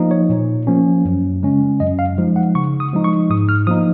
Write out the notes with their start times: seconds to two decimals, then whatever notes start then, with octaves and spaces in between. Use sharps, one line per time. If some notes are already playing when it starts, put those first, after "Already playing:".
Already playing: F3 A#3 D#4
0.11 C#5
0.29 A#2
0.67 F3 A#3 C#4
1.05 F#2
1.43 C#3 G#3 C#4
1.80 F#2 D#5
1.99 F5
2.18 F3 G#3 D#4
2.36 F#5
2.55 C#3 C#6
2.80 D#6
2.93 F3 G#3 D#4
3.04 C#6
3.30 G#2 D#6
3.49 F6
3.67 F3 A#3 D#4 D#6